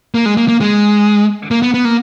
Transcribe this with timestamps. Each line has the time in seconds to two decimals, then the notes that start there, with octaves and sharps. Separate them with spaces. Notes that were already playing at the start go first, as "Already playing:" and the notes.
0.15 A#3
0.26 G#3
0.37 A#3
0.48 A#3
0.61 G#3
1.51 A#3
1.62 B3
1.74 B3
1.85 A#3